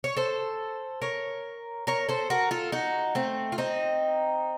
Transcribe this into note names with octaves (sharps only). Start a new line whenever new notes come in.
C#5
A4 C5
A#4 C#5
A#4 C#5
A4 C5
F#4 A#4
F4 A4
D#4 F#4
A3 C4
F4
C4 D#4